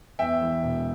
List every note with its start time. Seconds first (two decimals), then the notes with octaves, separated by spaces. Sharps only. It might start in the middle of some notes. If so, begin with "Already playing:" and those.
0.19 E2 E5 G5
0.41 E3
0.63 E1